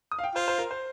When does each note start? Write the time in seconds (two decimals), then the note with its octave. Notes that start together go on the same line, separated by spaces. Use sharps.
0.12 D#6
0.19 F5
0.24 G5
0.35 F4 C5
0.48 C5
0.58 A#4
0.71 C5